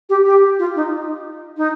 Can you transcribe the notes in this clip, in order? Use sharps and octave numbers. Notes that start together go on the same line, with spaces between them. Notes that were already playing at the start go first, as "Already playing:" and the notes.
G4
G4
F4
D#4
D#4